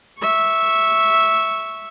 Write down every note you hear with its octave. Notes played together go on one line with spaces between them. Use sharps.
E5 C#6